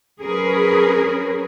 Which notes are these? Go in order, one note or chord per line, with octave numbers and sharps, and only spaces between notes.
F#3 C#4 G#4 A#4 B4